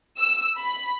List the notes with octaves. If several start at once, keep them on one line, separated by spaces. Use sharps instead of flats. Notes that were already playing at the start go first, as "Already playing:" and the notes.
E6
B5